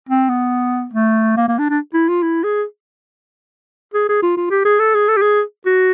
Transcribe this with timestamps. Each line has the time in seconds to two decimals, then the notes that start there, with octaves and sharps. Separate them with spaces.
0.09 C4
0.29 B3
0.93 A3
1.37 A#3
1.48 A#3
1.59 D4
1.69 D4
1.93 E4
2.08 F4
2.22 E4
2.44 G#4
3.94 G#4
4.09 G#4
4.22 F4
4.36 F4
4.50 G4
4.65 G#4
4.79 A4
4.94 G#4
5.08 A4
5.16 G4
5.22 G#4
5.66 F#4